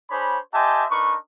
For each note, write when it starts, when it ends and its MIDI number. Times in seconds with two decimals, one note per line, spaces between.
0.10 0.38 62
0.10 0.38 68
0.10 0.38 72
0.10 0.38 73
0.10 0.38 83
0.54 0.85 67
0.54 0.85 72
0.54 0.85 75
0.54 0.85 76
0.54 0.85 80
0.54 0.85 81
0.90 1.16 62
0.90 1.16 63
0.90 1.16 70
0.90 1.16 71
0.90 1.16 85